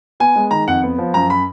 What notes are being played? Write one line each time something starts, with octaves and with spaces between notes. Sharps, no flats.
B3 G#5
G#3
D#3 A#5
F2 F#5
B3
F3
F#2 A#5
B5